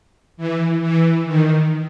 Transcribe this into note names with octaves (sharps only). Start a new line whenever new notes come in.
E3
E3
D#3